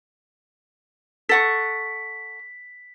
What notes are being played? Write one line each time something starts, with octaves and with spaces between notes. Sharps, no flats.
A4 F#5 C#6 B6